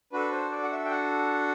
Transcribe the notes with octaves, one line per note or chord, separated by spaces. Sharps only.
D4 F#4 A4 B4
C5
D5
F#5
E5
G5
F#5